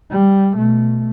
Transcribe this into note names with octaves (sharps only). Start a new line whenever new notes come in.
G3
B2 A3